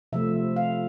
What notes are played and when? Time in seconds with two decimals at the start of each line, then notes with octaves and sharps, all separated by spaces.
0.12 C3 F3 A3 E5
0.56 F5